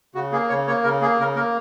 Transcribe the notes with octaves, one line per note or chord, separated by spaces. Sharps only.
C#3 F#4
A#3 G#4
C#3 C#5
A#3 C#5
C#3 A#4
A#3 G#4
C#3 A#4
A#3 A#4